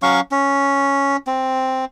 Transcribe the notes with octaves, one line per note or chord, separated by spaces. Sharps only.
F#3 C#4 F5 C#6
C#4
C4